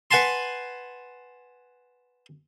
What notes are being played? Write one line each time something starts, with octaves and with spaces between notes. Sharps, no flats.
B4 F#5 G#5 A5 C6